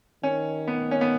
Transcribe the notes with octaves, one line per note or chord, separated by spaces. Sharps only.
D#3 C#4
B3
C#4
B3